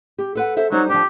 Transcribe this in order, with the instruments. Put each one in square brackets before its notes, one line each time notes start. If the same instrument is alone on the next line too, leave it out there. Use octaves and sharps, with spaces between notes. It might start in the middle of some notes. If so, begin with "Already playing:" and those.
[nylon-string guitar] G4
A4 B4 F#5
A4 C5 E5
[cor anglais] F#3 [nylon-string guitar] G3 D#4 C5
[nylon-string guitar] F3 D4 [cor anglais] G4